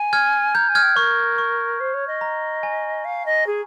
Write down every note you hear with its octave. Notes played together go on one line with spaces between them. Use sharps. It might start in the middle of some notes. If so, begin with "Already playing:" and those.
Already playing: G#5
F6 G#6
A#5 G6
G#5
F6 G#6
G5
A#4 C#6
C#6
C5
C#5
D#5
A#5
G#5
F5
D#5
G#4